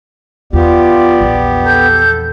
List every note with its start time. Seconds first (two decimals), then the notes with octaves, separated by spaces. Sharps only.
0.53 E2 B3 F4 G4 D5
1.20 A#1 E2
1.66 A4 G6